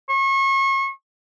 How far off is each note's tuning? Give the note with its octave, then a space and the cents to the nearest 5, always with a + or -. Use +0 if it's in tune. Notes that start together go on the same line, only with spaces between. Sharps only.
C#6 -35